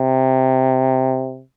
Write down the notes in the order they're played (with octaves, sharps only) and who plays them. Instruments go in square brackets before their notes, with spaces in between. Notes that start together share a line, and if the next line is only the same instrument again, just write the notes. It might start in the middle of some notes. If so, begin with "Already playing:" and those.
Already playing: [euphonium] C3